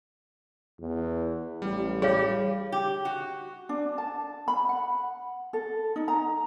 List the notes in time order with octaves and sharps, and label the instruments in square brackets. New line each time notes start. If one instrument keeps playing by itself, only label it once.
[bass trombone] E2
[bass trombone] A1 [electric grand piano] G3
[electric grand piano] G3 [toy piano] G#4 C#5 F5
[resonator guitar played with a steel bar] G4
F#4
[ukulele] D4
A5
B5
F#5
A4
D#4
A#5